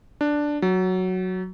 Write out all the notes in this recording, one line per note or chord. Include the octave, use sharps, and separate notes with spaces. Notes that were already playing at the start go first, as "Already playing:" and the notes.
D4
F#3